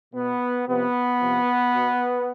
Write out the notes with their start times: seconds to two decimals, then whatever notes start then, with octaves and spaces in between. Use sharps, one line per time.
0.14 B2 B3
0.67 C3 F3 B3
1.20 C3 F3
1.74 B2